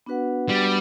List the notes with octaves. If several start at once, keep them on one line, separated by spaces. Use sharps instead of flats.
B3 D4 F#4 B4 F#5
G3